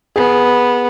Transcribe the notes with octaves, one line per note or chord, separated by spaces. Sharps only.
B3 G#4